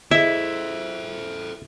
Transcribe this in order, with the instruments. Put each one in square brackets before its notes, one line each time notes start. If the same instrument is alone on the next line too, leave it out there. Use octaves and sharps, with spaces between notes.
[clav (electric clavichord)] E4 [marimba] G#4 D#5 [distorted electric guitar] A4 C5 [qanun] E5